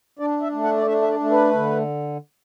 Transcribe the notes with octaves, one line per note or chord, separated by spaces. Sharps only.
D4 D5
E5
A3
F#5
D5
D4 E5
E5
D5
A3
B4
D3